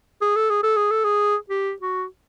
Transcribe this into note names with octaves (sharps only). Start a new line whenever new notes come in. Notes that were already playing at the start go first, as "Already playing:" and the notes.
G#4
A4
G#4
A4
G#4
A4
G#4
G4
F#4